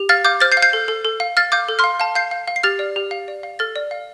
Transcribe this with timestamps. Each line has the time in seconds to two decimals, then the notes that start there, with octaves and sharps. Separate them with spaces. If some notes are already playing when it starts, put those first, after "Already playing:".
Already playing: G4
0.09 F5 F6 A6
0.25 F5 D6 G6
0.40 C5 F6 A6
0.52 G6 C7
0.57 F5
0.62 G6 C7
0.73 A4
0.88 A4
1.05 A4
1.20 F5
1.37 F5 F6 A6
1.52 F5 D6 G6
1.69 A4
1.79 C6 F6
1.84 F5
2.00 F5 A5
2.15 F5 G6 C7
2.31 F5
2.48 F5
2.56 C7
2.63 G4 F6 A6
2.79 D5
2.96 G4
3.11 F5
3.28 D5
3.43 F5
3.59 A4 F6 A6
3.76 D5
3.91 F5